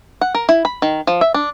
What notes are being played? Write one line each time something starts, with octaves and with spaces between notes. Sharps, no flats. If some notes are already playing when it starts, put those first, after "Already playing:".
F#5
A#4
E4
B5
D#3
F3
E5
D4